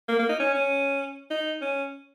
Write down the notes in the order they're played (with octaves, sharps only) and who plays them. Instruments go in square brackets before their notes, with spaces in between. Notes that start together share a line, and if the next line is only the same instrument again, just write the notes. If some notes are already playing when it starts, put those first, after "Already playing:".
[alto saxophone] A#3
A#3
D#4
C#4
C#4
D#4
C#4